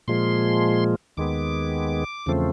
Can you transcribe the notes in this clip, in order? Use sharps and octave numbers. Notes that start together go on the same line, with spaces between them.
A#2 F3 G#3 C6
D#2 D#3 G#3 B3 D6
E2 C#3 F3 A3 C4